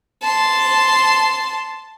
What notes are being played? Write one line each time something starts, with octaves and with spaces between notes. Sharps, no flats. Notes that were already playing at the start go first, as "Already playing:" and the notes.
A5 C6